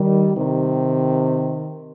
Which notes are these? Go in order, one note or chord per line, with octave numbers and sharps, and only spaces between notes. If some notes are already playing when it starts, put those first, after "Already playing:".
Already playing: D#3 G3
C3 D#3